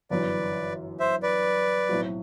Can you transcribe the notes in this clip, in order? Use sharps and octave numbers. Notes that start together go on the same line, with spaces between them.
G1 F#2 E3 B4 D5
C5 E5
B4 D5
B1 A2 F#3 C4 F#4